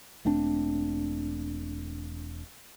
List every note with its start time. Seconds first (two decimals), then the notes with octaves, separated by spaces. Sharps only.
0.25 E1 A3 C4 D4